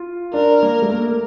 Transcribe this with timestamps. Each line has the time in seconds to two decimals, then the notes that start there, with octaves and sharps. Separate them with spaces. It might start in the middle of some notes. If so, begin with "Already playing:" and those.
Already playing: F4
0.33 D4 A#4
0.63 A#3
0.82 A3
0.92 A#3